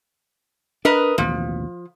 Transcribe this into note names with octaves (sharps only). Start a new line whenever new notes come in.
D4 A#4 B4 D#5
A1 D#2 B2 F3